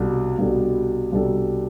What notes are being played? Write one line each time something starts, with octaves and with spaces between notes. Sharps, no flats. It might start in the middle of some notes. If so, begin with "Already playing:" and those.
Already playing: C2 B2 G3 D4 A4
C2 B2 G3 D4 A4
C2 B2 G3 D4 A4